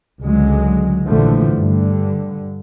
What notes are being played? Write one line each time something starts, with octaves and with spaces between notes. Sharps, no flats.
C#2 D3 F#3 G#3
A#1 D3 E3 F3 A3
G2 D3